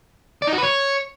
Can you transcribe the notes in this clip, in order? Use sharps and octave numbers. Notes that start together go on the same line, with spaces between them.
D5
D#4
F#4
B4
C#5